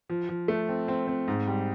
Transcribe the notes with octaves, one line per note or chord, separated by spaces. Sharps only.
F3
F3
A3
C4
C4
C4
G#2
G3